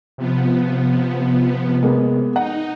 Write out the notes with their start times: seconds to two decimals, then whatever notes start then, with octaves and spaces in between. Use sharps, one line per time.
0.18 C3 F3 B3
1.83 G#3 A#3 B3
2.36 D#4 F#5